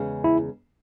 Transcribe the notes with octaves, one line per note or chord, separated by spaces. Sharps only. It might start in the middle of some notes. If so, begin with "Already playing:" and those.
Already playing: E2 C#3 G#3 C#4 G#4
E4